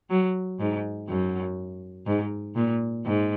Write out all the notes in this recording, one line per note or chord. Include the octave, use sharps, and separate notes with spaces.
F#3
G#2
F#2
G#2
A#2
G#2